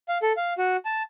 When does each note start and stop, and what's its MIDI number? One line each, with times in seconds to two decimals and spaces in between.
0.08 0.18 77
0.22 0.33 69
0.37 0.53 77
0.58 0.77 66
0.85 1.03 81